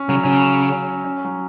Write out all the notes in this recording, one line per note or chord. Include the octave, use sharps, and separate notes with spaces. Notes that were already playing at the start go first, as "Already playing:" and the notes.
Already playing: C#4
C#3 F#3
C#3 C#4
C#4
F#3